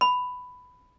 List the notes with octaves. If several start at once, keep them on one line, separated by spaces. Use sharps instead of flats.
B5